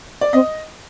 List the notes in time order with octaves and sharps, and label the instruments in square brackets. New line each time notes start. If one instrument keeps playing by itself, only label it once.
[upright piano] D5
[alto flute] C4 [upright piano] D#5